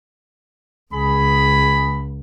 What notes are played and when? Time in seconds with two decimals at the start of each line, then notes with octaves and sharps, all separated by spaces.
0.93 C#2 G#4 B5